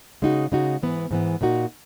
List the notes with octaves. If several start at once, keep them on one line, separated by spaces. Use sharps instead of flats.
C#3 G#3 D#4 F#4
C#3 G#3 D#4 F#4
G#2 E3 B3
G#2 E3 B3
A#2 A#3 D#4 F#4